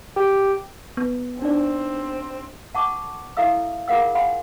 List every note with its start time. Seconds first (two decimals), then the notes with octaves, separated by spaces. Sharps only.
0.16 G4
0.97 B3
1.42 C4 D4 D#4 D5
2.75 F#5 A5 C#6 D6
3.37 E4 A4 E5 F5 E6
3.88 F4 G#4 A#4 F5 F#5 E6
4.15 F5 F#5 G#5 B5 C6